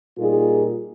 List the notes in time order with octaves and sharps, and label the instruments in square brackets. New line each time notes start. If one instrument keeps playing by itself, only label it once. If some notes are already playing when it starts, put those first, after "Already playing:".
[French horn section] A#2 G3 A#3 D#4 F4 G#4